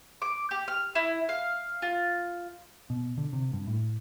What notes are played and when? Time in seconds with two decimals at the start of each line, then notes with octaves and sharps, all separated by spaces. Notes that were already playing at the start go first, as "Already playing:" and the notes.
0.22 D6
0.51 G4
0.68 F6
0.95 E4
1.29 F5
1.82 F4
2.90 B2
3.18 D3
3.33 C3
3.53 G2
3.67 A2